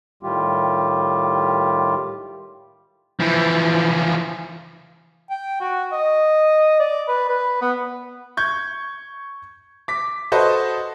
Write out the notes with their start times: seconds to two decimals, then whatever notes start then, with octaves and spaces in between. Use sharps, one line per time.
0.23 A2 D#3 G3 F4 G4
3.20 E3 F3
5.30 G5
5.61 F#4
5.92 D#5
6.80 D5
7.08 B4
7.29 B4
7.62 B3
8.37 C#6 G6 G#6
9.88 D6 B6
10.32 F#4 A4 B4 C5 D#5 A5